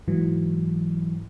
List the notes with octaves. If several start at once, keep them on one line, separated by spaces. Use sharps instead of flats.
G#2 E3 F#3